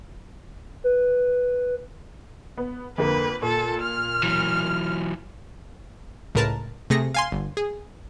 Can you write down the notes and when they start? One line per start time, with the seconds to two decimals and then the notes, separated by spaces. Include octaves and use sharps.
0.84 B4
2.57 B3
2.98 F2 D3 A#3 B4
3.42 A#2 A4
3.82 F6
4.23 E3 F#3
6.35 C#2 A2 G#3 A#4 B4 A5
6.90 C3 A3 G#4 A#6 C#7
7.14 F5 G#5 C6
7.32 G1
7.57 G#4